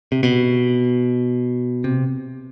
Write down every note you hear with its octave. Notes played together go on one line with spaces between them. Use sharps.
C3
B2
C3